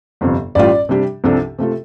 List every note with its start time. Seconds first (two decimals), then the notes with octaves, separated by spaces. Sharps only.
0.21 G1 F2 C3
0.55 A1 A2 G3 F4 D5
0.89 C3 G3 D4 G4
1.24 C2 C3 F3 D4 A4
1.59 C3 A3 F4 A4